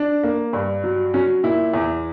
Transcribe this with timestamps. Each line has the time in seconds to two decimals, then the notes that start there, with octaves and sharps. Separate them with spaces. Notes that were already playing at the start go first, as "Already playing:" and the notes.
Already playing: D4
0.23 A#3
0.53 G2
0.84 F#3
1.14 F#3 C#4
1.43 A#2 E4
1.74 E2